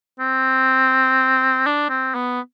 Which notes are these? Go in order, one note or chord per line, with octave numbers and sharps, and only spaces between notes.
C4
D4
C4
B3